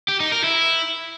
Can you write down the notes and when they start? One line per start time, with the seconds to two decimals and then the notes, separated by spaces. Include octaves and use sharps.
0.08 G4
0.20 D#4
0.32 A#4
0.44 E4